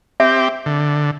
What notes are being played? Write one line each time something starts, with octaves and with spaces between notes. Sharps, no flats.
C4 G4 E5
D3